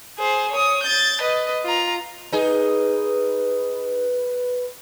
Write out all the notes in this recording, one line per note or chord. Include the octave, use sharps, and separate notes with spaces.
G#4 C5
C#5 D#6
G6 A6
B4 D#5
F4 A#5
D#4 G#4 B4